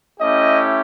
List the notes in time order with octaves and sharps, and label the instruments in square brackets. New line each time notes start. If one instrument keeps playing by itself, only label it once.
[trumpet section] A3 C#4 E4 G4 D#5